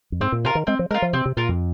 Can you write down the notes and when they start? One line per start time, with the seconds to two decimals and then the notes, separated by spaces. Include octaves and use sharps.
0.12 F2
0.21 G#2 C4
0.32 A#2
0.44 C3 F4 A#4
0.55 D#3
0.67 G#3 C4
0.79 F3
0.90 G#3 F4 A#4
1.02 F3
1.13 C3 C4
1.26 C3
1.37 A#2 F4 A#4
1.49 F2